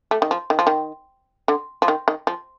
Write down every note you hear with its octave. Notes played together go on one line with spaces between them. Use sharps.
A3
D#3
F3
D#3
F3
D#3
D3
F3
D#3
D#3
F3